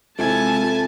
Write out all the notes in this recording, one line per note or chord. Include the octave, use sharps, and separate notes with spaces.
C3 G#3 E4 F4 A4 G#5 A5 G#6